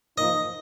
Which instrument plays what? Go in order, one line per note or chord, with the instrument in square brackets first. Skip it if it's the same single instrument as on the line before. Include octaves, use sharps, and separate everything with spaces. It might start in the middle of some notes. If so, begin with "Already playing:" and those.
[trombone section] F3 A#3 D#4 [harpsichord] D#5